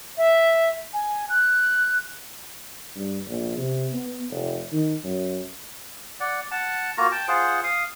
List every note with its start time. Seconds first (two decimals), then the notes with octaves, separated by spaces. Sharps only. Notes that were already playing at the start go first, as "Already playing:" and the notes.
0.17 E5
0.93 G#5
1.29 F#6
2.96 G2
3.28 A#1
3.57 C3
3.92 B3
4.30 F1
4.73 D#3
5.04 F#2
6.20 D5 F#5
6.51 F#5 A5
6.98 A#3 F4 F#4 A#5
7.12 G5 A5
7.28 F4 G#4 C5 F#5
7.64 F5 D#6